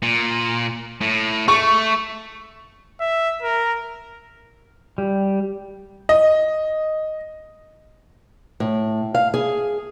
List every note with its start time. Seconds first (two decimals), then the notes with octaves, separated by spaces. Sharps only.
0.02 A#2
1.01 A2
1.48 A3 C#6
3.00 E5
3.42 A#4
4.98 G3
6.09 D#5
8.60 A2
9.15 F5
9.34 G#4